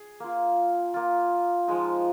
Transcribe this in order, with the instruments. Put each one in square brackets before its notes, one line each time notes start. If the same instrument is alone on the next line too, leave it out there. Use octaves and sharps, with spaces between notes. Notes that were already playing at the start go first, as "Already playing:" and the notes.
Already playing: [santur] G#4
A#3 F4
A#3 F4
F3 G#3 D#4